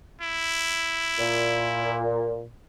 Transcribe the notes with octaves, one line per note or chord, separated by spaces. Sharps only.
E4
A#2